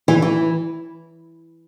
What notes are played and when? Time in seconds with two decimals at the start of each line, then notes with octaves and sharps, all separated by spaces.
0.08 E3
0.22 E3